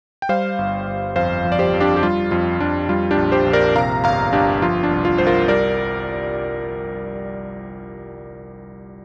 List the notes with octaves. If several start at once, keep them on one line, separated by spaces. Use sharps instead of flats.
G5
G3 C5 F5
G1
G1
F2 C5 F5
F3
D5
G4 C5
F2
D4 G4
G4
G3 F4
F2 F4
F2 D4
G3 F4
D4 G4
A#1
G4 C5
A#1
A#4 D5
C3 F5 A#5
G1 F5 A#5
G1 D4 G4
F3 F4
D4
C2
F4
C2 C5
F4 A#4
G3 A#4 D5